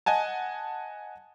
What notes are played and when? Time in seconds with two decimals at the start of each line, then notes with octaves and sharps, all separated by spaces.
0.06 D#5 F#5 G#5 A5